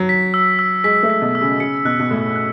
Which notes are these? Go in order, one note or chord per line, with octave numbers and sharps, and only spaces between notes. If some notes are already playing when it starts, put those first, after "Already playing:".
Already playing: F#3
B6
E6
E6
G#3 B6
A3
B6
B2
E6
C#3
C#3 C#7
B2 F#6
B2
A2 F#6
F#6